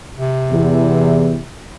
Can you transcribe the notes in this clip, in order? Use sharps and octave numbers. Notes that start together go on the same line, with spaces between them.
C3
E2